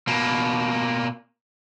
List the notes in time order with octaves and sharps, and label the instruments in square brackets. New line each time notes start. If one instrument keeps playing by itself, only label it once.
[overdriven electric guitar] B2 A#3